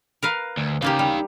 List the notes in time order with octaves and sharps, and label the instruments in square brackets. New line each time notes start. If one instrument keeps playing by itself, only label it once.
[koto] A#4 B4 F5
[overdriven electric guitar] D2
[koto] C#3 A#3 G4 [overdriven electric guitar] D#4 F5
[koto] G3